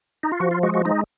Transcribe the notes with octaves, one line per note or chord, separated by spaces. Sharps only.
D#4
F4
F3 F#4
F4
G#3 F#4
F#4
G#3 D#4